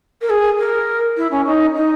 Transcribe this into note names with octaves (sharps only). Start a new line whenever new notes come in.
A#4
G#4
A#4
E4
C#4
D#4
D#4